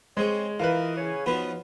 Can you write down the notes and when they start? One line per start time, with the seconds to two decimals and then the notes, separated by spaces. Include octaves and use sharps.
0.17 G#3 C4 G#4 C#5
0.60 E3 F4 A#4 B4 D#5 F5
0.96 C#3 C#5 G#5
1.26 F3 F#3 B3 D#4 F4 B4